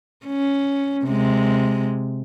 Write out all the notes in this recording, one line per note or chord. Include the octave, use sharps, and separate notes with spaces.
C#4
C3 G#3